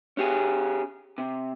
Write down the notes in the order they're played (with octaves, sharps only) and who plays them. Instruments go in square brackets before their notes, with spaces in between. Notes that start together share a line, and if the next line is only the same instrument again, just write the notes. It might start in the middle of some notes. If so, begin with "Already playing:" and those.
[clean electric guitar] C#4 G4 G#4
C3